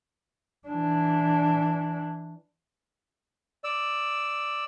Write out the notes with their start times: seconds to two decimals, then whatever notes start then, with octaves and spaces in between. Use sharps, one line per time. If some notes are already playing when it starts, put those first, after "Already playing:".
0.68 E3 D4
3.64 D5 E6